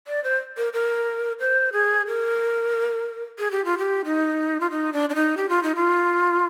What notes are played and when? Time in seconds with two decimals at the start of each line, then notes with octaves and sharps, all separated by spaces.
0.07 D5
0.24 C5
0.57 A#4
0.73 A#4
1.40 C5
1.73 G#4
2.07 A#4
3.39 G#4
3.51 G4
3.65 F4
3.78 G4
4.05 D#4
4.61 F4
4.71 D#4
4.93 D4
5.10 D4
5.15 D#4
5.37 G4
5.49 F4
5.63 D#4
5.76 F4